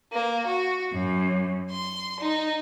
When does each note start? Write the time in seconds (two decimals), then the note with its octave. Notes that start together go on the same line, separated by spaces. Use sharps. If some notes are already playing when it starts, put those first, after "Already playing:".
0.12 A#3
0.47 F#4
0.93 F#2
1.69 C6
2.19 D#4